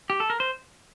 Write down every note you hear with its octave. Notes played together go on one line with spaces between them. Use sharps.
G4
A4
A#4
C5